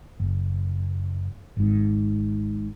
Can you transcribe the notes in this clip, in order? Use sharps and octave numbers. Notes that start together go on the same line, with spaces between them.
F#1
G#1 G#2